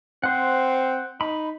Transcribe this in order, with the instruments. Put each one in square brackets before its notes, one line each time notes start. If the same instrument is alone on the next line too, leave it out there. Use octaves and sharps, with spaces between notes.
[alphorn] C4 [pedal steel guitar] C5 F#5
[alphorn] D#4 [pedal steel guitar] B5